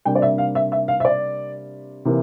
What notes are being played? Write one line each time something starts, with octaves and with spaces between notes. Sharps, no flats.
C3 G3 A#3 D4 G5
D5
E5
F5
E5
E5
F5
E5
D5
C3 E3 A#3